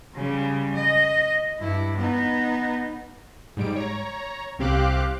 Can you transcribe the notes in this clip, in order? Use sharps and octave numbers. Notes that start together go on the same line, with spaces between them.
C#3 G3
D#5
G2 E4
B3 D#4
G#2 G3 D7
C#5 A#5
C2 C4 G4 F5 D6 F#6